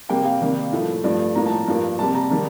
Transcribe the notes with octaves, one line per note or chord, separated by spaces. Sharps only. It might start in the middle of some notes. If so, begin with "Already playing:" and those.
C3 G3 A#3 G5
F5
C3 D#3 G3 A#3
A2 F3 A3
G2 F3 A3 D5
A2 F3 A#3 A#5
A5
G2 F3 A#3
C3 G3 A#3 A5
A#5
D#3 G3 A#3 A5